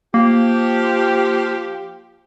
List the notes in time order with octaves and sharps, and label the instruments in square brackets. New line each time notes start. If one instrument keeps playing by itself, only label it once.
[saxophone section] F3 G4 [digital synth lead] A#3